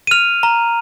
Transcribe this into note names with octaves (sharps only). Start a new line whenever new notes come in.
D#7
F6 F7
A#5